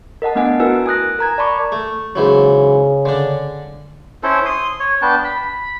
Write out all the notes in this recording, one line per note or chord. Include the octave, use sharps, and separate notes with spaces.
A#4 D#5 F#5 A5
A3 B3 D4 D#5 F#5 G#5
E4 F#4 A#4 B4 G#5 E6
G#5 D#6 F#6 A#6
A#4 A#5 G#6
D5 A5 B5 C#6 D6
A3
G#2 C#3 E3 F#3
D3 D4
C#4 E4 A4 C5
C6 D#6
C#5
B3 D4 G5 A5
B5